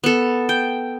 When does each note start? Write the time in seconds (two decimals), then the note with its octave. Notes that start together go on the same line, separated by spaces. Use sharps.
0.04 B3 A4
0.49 G5